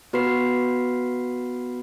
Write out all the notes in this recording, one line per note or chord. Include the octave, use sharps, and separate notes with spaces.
B3 F#4 B4 B5 B6 C7